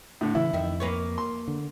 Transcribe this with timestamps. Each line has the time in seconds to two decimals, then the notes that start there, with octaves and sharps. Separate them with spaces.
0.21 A2 D3
0.35 C#3 E3 E4
0.53 F2 D#3 E5
0.80 A#3 B4 C#5
1.18 C6
1.48 D3